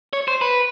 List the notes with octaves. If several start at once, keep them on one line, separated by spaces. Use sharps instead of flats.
C#5
C5
B4